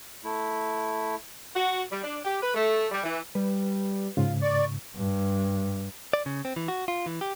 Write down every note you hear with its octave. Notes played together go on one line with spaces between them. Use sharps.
A3 E4
F#4
G3
D4
G4
B4
A3
G3
E3
G3 B4
G#2 C#3 F4
D5 C#6
G2
D5
C#3
C4
E3
F#4
F4
E3
G4